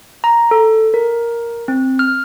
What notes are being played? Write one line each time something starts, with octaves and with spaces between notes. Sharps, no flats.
A#5
A4
A#4
C4
F6